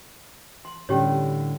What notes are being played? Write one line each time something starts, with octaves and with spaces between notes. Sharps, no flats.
C6
A2 D3 G3 C#4 G4 C#5